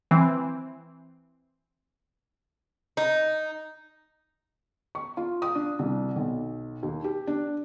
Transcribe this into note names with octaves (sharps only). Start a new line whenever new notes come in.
E3 C4
D#4
C#6
F4
D#6
D4
C2
B1
D#2
G4
D4